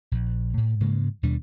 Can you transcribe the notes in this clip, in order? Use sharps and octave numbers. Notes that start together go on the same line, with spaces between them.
A#1
A2
G#2 C#3 G#3 A#3
D#2 B2 G3 D4